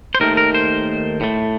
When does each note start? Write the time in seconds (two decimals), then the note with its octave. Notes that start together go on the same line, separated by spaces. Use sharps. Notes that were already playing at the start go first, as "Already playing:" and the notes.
0.15 C5
0.20 D#2 D#3 A3 A#4
0.37 A#4
0.54 C5
1.21 A2 A3